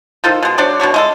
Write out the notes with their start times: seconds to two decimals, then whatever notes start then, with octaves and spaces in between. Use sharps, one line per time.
0.24 D#3 F4 A4 C5
0.43 B2 G#3
0.58 F#3 D4 C5 D5
0.80 B2 D4 F#4 C#5
0.94 G#3 F4 A4